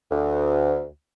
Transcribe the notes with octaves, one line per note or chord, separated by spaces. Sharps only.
D2